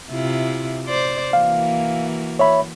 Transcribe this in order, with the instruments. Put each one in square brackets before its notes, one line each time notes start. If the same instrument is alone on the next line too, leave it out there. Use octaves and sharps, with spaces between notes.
[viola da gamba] C3 E4 F4
C5 D5
[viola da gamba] E3 A#3 F#4 [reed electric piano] F5
[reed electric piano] C#5 E5 B5